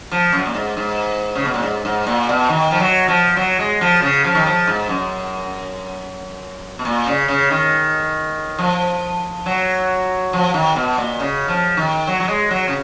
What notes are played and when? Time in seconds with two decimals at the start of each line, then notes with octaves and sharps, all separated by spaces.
0.11 F3
0.32 F#2
0.46 A#2
0.54 G#2
0.77 G#2
1.35 C#3
1.45 B2
1.54 A#2
1.63 G#2
1.85 G#2
2.07 A#2
2.29 B2
2.50 D#3
2.71 F3
2.80 F#3
3.08 F3
3.37 F#3
3.59 G#3
3.81 F3
4.02 C#3
4.24 F3
4.35 D#3
4.46 F3
4.67 G#2
4.89 F#2
6.79 B2
6.85 A#2
7.06 C#3
7.28 C#3
7.51 D#3
8.59 F3
9.46 F#3
10.33 F3
10.54 D#3
10.76 B2
10.98 A#2
11.20 C#3
11.48 F3
11.77 D#3
12.07 F#3
12.20 F#3
12.28 G#3
12.51 F#3
12.68 C#3